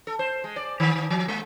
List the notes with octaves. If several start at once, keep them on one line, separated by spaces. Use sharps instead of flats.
A4
C5
G#3
D5
D#3
D#3
F3
G#3